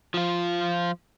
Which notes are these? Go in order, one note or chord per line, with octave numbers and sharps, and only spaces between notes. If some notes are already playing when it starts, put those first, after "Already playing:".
F3 F4